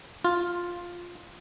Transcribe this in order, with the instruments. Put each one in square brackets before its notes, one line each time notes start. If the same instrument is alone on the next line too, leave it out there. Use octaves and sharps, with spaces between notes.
[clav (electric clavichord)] F4